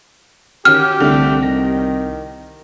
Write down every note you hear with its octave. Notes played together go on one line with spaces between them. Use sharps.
D#3 C#4 F#4 G4 F6
C2 D3 A3
D#3 A#6